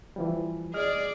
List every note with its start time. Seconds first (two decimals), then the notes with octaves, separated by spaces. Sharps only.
0.16 E3 F3 G3
0.74 G#4 D5 D#5 F6